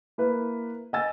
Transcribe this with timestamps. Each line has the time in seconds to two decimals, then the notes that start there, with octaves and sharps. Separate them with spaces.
0.18 A#3 E4 B4
0.93 D#5 G#5 E6 A6